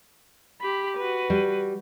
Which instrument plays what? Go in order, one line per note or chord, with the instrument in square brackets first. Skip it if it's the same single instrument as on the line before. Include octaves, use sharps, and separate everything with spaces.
[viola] G4 B5
F#4 B4
[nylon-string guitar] G3